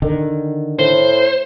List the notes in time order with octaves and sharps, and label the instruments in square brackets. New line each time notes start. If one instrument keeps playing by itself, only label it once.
[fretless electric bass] D3 D#3
[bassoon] A2 [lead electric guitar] C5